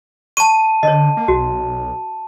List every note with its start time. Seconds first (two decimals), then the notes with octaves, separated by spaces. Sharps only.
0.37 A5 C#6 D#7
0.83 D3 C#5 D#5
1.17 A#3
1.28 B1 F#4